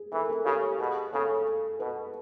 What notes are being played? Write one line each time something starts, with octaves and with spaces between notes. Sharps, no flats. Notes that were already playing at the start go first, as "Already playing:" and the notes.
Already playing: G#4
E3 A4
A#4
A4
C#3 G4
B2 G#4
C#3 A4
B2 B4